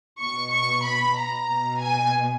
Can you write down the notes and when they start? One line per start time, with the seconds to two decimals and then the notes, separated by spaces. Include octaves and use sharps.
0.21 B2 C#6
0.53 C#6
0.86 B5
1.18 A#5
1.50 B2
1.81 G#5